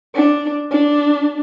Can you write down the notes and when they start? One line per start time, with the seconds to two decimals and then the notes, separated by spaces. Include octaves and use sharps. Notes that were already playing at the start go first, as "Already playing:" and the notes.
0.15 D4
0.71 D4